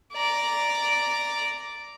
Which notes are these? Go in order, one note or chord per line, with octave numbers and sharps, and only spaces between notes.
D5 A#5